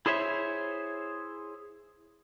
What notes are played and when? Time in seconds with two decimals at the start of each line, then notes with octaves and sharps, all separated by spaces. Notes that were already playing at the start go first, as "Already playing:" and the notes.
0.06 E4 G#4 C5 C#5 E5